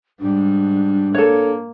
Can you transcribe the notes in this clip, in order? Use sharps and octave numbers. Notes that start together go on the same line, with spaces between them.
G#2 G3 D4
A#3 A4 C#5